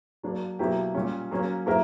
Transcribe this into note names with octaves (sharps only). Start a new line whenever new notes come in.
F#3 A#3 D4
B2 F#3 A#3 E4 G4
A#2 G3 C#4
F#3 A#3 C#4
F#3 A#3 E4 A#4